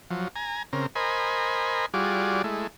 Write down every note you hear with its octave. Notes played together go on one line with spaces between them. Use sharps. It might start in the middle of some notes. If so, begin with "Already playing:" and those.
F3 F#3
G#5 A#5
C#3 C4 A#4
A#4 C5 D#5 G#5 B5
G3 F4 F#4 G#4 D5
G#3 A3 E4